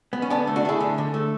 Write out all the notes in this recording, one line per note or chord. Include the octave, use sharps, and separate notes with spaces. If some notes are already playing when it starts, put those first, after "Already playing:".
B3
C#4
D3 B3 D4
A3
D4 F#4
A3 E4 G#4
D3
D3
A3